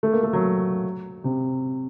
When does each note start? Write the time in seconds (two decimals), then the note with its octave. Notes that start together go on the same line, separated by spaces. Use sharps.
0.03 A3
0.12 A#3
0.23 A3
0.33 F#3
1.24 C3